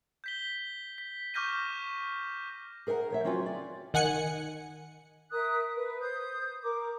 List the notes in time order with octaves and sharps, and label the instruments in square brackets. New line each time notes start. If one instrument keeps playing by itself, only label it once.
[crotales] G6 B6 G7
B6
C#6 D6 F6 G6 A#6 D#7
[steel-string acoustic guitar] G#4 A#4 C#5 F#5 A#5
F3 C#5 E5
F#3 C4 C#4 F4 F#4
D5
[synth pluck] D#3 F#5 G#5 F#6 C#7
[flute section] A#4 E5 D#6 F#6
B4
C5 D#6 G6
A#4 D6